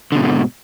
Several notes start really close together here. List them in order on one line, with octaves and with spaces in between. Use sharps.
D3 B2 G#2